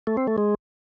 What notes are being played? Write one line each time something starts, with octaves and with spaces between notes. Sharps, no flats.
A3
C4
A3
G#3